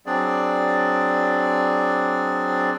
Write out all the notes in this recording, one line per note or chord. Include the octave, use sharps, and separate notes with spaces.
F#3 C4 D4 G#4 D5